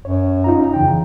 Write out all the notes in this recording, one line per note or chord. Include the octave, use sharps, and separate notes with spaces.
F#2 C#5
D#4 F4 A#5
E2 C#3 E3 G5